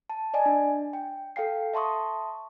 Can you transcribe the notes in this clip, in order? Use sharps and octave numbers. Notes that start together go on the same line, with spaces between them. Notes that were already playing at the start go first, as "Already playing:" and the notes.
A5
D5 D#5 G#5
D4
G5
A4 F5 G5 C7
E5 A5 C6 C#6 D#6